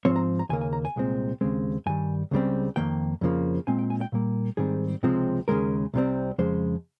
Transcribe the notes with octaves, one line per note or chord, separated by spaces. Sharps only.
G#2 F3 C4 C#5
A#5
A#5
D#2 C#3 A#3 G#5
G#5
A#5
G#5
C2 A#2 G#3 C4
D#2 C#3 G#3 C4
G2 D#3 G3 G#5
C#2 C#3 G3 C4
F2 D#3 A#3 G5
F2 C#3 F3 A#3
A#2 G#3 C4 G#5
G5
G#5
G5
A#2 G3 A#3
G#2 D#3 G3 C4 G#4
C#2 C3 F3 G#3 C4
D#2 C#3 F3 G#3 A#4
C2 C3 G3 C4
F2 C#3 F3 G#3 C5